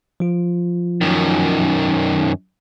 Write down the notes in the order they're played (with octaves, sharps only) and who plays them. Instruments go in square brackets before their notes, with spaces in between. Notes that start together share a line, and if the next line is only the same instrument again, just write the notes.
[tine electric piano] F3 F4
[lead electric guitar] F#2 D#3